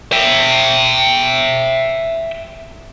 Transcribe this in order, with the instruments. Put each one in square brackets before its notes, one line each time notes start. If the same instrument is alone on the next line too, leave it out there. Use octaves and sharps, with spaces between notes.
[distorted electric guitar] E5 G5